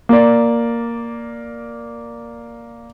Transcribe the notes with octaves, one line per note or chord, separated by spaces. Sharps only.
A#3 D5